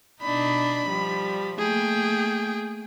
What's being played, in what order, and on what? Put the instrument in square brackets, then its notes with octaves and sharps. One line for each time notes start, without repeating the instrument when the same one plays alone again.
[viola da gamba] B2 D4 D#4 [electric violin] B5
[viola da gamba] F3 G3
[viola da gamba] A3 A#3 [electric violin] G#4 G5